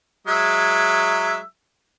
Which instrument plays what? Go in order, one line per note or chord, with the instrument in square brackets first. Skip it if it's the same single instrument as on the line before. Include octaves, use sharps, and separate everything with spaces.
[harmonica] F#3 G#3 E5